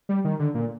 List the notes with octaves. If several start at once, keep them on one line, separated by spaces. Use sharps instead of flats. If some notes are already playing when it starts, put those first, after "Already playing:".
G3
D#3
D3
A#2